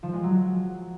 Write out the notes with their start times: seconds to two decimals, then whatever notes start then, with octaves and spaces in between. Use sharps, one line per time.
0.03 F3
0.13 G#3
0.23 F#3